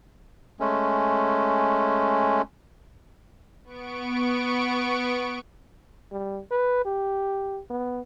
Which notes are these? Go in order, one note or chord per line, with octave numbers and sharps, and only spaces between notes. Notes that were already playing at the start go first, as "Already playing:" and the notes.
G#3 A3 C#4
B3 C#6 D7
G3
B4
G4
B3